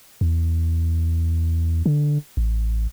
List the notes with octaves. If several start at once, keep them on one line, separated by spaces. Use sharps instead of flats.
E2
D3
A1